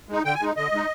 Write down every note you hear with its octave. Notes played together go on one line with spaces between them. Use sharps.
G#3 D#4
D3 G5
G#5
G#3 D#4
D3 D#5
G#3 D#4